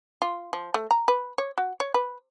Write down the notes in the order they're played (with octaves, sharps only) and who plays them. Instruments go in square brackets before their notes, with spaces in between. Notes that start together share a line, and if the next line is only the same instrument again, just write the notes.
[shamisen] F4
F3
A3
A#5
B4
C#5
F#4
C#5
B4